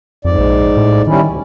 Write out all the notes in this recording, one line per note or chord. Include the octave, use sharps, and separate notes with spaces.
F2 G#2 D5
A#1
A2
D#3 G3 C#4 E4
D2